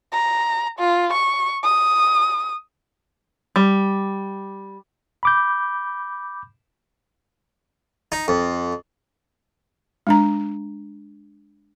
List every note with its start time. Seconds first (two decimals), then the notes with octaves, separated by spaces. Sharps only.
0.13 A#5
0.79 F4
1.13 C#6
1.63 D#6
3.56 G3
5.23 B5 D6 G6
8.12 D#4
8.28 F2
10.07 G#3 D4 A#5